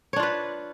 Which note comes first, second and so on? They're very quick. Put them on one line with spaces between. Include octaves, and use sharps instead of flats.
C#5 D4 F4 B4